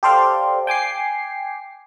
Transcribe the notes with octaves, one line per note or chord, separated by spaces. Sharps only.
G4 A4 C5 D5 F5 G5
G5 G#5 D6 C7